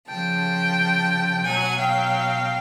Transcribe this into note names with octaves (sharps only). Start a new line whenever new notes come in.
C#3 F3 G5 A5
B2 F#3 F#5 G#5
F5 G5